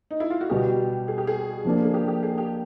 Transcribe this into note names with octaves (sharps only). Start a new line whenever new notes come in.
D#4
E4
F4
F#4
B2 G3 B3 G4
G#4
G4
G#4
F3 A#3 D4
G#4
G4
G4
G#4
G4